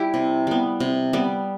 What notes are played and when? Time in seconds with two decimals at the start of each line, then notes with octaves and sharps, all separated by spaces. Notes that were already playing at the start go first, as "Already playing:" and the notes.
Already playing: G3 E4 G4
0.14 C3
0.47 G3 B3
0.80 C3
1.13 G3 B3